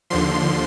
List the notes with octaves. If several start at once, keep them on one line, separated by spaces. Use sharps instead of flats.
D#2 D3 F3 C6